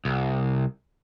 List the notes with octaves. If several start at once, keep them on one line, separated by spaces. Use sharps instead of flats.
C2